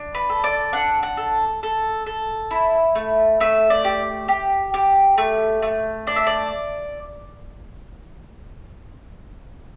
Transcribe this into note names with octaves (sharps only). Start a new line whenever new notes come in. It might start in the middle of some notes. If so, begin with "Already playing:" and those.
Already playing: D4
B4
A4
D5
D4 F#5
F#5
A4
A4
A4
E4
A3
A3 E5
D5
G4
G4
G4
A3
A3
D4 D5
E5
D5